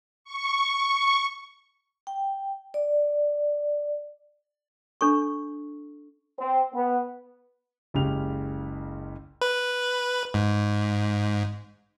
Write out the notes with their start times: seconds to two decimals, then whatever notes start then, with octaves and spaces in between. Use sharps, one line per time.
0.24 C#6
2.07 G5
2.74 D5
5.01 D4 A4 C#6
6.39 C4
6.74 B3
7.94 F#1 C#2 C#3 G4 F7
9.42 B4
10.34 G#2